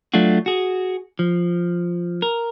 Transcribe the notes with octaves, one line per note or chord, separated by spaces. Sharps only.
F#3 A3 D4 F4 F#4
F#4 G#4
F3
A#4